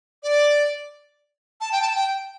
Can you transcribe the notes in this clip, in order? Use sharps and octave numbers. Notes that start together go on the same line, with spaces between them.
D5
A5
G5
A5
G5